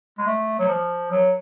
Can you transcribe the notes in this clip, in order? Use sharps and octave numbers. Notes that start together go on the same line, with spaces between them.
G#3
A3
F#3
F3
F#3